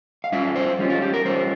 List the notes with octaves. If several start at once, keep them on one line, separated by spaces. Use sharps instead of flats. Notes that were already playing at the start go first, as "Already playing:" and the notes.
F5
G3 C#4 F4 E5
C5
G3 C#4 F4
F4
G4
A#4
G3 C#4 F4 C5